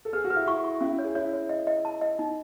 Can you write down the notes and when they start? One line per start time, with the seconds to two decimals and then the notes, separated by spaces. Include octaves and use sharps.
0.05 A4
0.13 G#4 B4
0.24 F#4
0.30 B4
0.36 E4
0.46 E4 C#6
0.64 C#6
0.81 C#4 E4
0.99 C#5
1.04 G#4
1.15 E4 C#5
1.33 C#5
1.49 D#5
1.67 D#5
1.85 A5
2.01 D#5
2.19 D#4